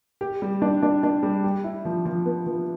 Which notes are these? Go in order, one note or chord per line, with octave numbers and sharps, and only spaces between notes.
G4
G3
D4
D4
D4
G3
G4
E4
F3
F3
B3
F3